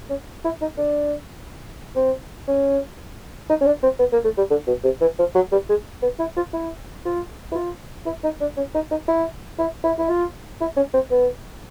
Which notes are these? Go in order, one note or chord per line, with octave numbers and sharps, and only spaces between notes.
C#4
E4
D#4
D4
C4
C#4
D#4
C#4
D4
C4
B3
A#3
A3
G3
D3
B2
C3
E3
F3
F#3
G3
G#3
B3
E4
F4
E4
F4
E4
F4
E4
D#4
D4
C#4
D#4
D#4
E4
E4
E4
E4
F4
E4
C#4
C4
B3